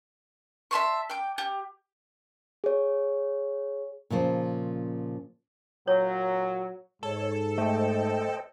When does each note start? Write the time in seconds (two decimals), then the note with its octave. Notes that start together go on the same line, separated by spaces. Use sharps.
0.71 E5 A5 C6 C#6
1.10 G5 D6
1.38 G4
2.64 G#4 C#5
4.10 A#2 C#3 F3 C5
5.87 A#2 F#3 C#5
7.03 G#2 A4 C#5
7.58 A3 C5 D#5 G5